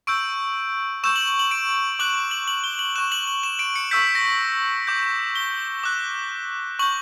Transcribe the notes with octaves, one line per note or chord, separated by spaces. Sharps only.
C#6 E6 G6 D7
C#6 E6 G6 E7
F#7
F#7
F#7
D7
D6 F#6 F#7
F#7
F#7
G7
F#7
C#6 F#6 E7
F#7
F#7
E7
D7
C#7
C#6 E6 G6 B6
A#6
D6 G6
G7
D6 F#6
C#6 G6 F#7